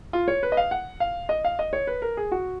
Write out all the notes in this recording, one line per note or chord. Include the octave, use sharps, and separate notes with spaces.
F4
C#5
B4
D#5
F5
F#5
F5
D#5
F5
D#5
C#5
B4
A#4
G#4
F#4